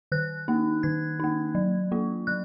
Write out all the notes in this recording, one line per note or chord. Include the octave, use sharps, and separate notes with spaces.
D#3 F#6
A#3 D#4
D#3 G#6
A#3 D#4
F#3
A#3 F4
F#3 F#6